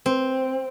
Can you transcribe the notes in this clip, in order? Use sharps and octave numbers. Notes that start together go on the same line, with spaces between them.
C4